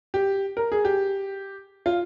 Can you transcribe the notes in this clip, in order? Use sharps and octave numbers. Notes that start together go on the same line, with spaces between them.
G4
A#4
G#4
G4
F4